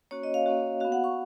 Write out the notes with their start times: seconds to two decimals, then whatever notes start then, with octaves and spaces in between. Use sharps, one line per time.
0.11 A#3 C#4 F#4 C#5
0.23 D#5
0.34 F5
0.46 A#3 C#4 F#4
0.80 B3 F#4 F5
0.92 F#5
1.04 C#6